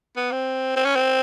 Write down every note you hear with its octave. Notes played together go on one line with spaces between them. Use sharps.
B3
C4
C4
C#4
C4